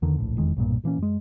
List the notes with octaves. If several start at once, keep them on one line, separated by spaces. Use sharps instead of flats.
E2 D3 D#3
D1 A#1 A2
F1 E2 D#3 G#3
B1 G2 A#2
A#2 E3 A#3 C#4
F#2 G#3